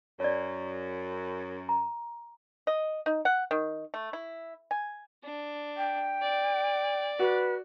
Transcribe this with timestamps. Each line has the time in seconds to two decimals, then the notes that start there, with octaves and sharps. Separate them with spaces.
0.20 F#2 C#5 D5
1.69 A#5
2.67 D#5
3.06 D#4
3.25 F#5
3.51 D#3
3.94 A3
4.13 E4
4.71 G#5
5.23 D4
5.77 G5
6.21 D5
7.19 F#4 B4